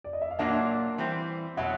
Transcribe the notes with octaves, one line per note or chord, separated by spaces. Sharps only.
D5
D#5
E5
F5
A#2 F#3 A#3 D4 F4 E5 F#5
E3 G3 C4
B2 F#3 E5 F#5